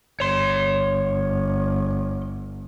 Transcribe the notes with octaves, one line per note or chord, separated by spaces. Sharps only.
G1 C#5 C6